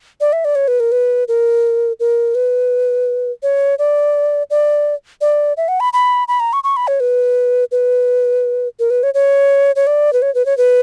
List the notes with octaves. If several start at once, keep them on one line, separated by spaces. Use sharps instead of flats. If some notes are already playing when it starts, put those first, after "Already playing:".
D5
E5
D5
C#5
B4
A#4
B4
A#4
A#4
B4
C#5
D5
D5
D5
E5
F#5
B5
B5
B5
A#5
C#6
C#6
B5
C#5
B4
B4
A#4
B4
C#5
C#5
C#5
D5
B4
C#5
B4
C#5
B4